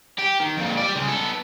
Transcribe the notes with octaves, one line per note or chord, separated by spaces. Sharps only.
G4
D#3
F2 A#2
G3 D5
C#3 G#3
B3 A4